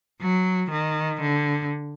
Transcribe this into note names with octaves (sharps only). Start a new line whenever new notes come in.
F#3
D#3
D3